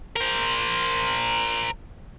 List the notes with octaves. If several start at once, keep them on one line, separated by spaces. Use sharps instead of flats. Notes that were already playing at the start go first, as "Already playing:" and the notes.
A#4 C5